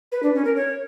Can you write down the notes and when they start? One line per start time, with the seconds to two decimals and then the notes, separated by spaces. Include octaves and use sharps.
0.12 B4
0.23 D4
0.34 C#4
0.45 A#4
0.56 C#5